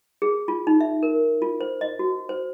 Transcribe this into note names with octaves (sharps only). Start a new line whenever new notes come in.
G#4
F4
D#4
E5
A#4
F4
C5
D#5
F#4
C5